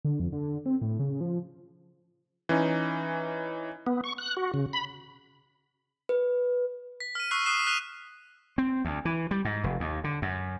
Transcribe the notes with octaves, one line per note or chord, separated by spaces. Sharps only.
D3
F2
D3
C4
A2
C#3
F3
E3 C#4 D#4
B3
C#6
F#6
F#4
C#3
B5
B4
B6
F6 D#7
C#6 E6 F#6 C7
D#6 F#6 C7 E7
F6 F#6 B6 D#7 F7
C4
D2
E3
G3
G#2
F1
D#2
D3
F#2